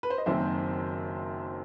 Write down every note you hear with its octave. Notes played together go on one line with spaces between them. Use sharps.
B4
C5
D#5
F#1 F#2 D#3 F#3 C4 C5 E5